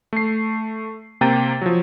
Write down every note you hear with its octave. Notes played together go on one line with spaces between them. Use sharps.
A3 C7
C3 A#3 G5 A#5 A6 D#7
F3 F#3